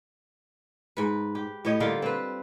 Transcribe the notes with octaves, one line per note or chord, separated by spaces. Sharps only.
G#2 B4
G4
A2 G4 C#5 D#5
D3 G3 A#3 F4
C4 B4